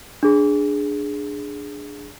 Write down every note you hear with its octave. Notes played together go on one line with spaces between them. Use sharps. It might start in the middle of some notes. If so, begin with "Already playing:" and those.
D4 G#4